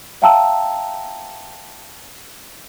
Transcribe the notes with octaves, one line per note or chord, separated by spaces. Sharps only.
E5 F5 G5 A5 A#5 E6